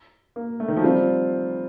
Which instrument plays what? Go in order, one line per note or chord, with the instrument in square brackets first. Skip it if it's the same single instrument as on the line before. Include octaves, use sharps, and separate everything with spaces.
[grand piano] A#3
A3
D#3
F3
[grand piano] G3 [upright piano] C4 F4